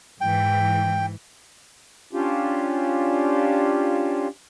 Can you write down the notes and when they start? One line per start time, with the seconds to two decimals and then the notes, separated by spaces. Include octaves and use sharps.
0.21 G#2 E3 G5
2.13 C#4 D4 F4 G4